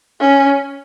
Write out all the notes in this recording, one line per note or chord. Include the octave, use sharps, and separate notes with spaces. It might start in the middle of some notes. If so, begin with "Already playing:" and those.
C#4